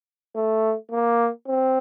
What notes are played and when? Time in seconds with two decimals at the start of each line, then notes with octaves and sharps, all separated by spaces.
0.36 A3
0.91 A#3
1.47 C4